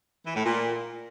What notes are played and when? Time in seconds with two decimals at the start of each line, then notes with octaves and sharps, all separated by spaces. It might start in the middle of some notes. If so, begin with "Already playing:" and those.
0.25 E3
0.35 A2
0.45 A#2